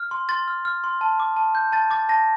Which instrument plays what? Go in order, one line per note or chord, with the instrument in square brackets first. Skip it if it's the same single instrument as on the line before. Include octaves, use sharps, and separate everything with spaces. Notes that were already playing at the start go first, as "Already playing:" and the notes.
Already playing: [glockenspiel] F6
C6
C6 A6
F6
F6
C6
A5
D6
A5
G6
A5 A6
D6 A6
A5 A#6